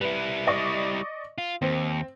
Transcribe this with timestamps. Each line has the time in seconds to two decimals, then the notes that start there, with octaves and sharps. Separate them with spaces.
0.01 G3 E4 B4
0.47 D5 D#5 C#6
1.38 F4
1.62 D#2 C4